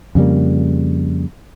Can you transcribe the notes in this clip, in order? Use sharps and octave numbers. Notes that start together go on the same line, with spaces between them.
F2 C#3 G3 A#3